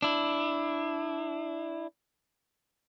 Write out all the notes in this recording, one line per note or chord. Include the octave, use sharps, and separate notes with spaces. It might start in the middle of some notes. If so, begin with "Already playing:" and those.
D4 E4